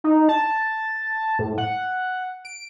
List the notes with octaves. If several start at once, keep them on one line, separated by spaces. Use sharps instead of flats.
D#4
A5
A2
F#5
D7